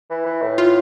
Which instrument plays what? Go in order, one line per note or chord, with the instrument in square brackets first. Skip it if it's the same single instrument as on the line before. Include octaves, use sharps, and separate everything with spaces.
[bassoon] E3
E3
A2
[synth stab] F4